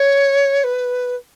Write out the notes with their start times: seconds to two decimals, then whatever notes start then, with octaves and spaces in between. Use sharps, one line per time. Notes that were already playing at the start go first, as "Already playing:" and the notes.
Already playing: C#5
0.63 B4